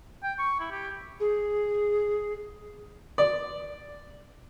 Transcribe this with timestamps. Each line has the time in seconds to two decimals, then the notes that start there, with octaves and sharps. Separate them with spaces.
0.23 G5
0.39 C#6
0.60 E4
0.71 G4
1.20 G#4
3.18 D5